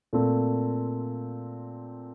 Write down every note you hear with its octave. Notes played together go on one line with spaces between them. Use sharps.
A#2 A3 C4